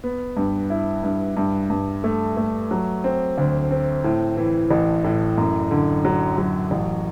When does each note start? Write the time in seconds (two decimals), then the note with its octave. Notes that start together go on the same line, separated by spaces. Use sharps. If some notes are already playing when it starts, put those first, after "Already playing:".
0.04 B3
0.37 G2
0.70 E4
1.04 G2
1.37 G2
1.70 G2
2.04 A3
2.37 A3
2.71 F#3
3.04 C4
3.38 D2
3.71 C4
4.04 A2
4.37 E3
4.71 A1
5.04 A2
5.38 F#2
5.71 D3
6.05 F#3
6.38 F#3
6.71 A1